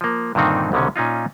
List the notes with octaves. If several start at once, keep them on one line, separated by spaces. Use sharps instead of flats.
F3 A#3
G2 A#2 D3 D#3 C4 D#4
C2 B2 D3 D#3 C#4
A#2 C#4 D#4 F4